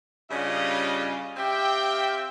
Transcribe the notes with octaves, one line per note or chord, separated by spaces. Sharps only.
G2 C#3 G3 C#4 F4 D#5
C4 G4 E5 F5 G5